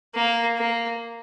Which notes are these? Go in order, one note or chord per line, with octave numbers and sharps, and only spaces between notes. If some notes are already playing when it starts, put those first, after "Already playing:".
A#3
A#3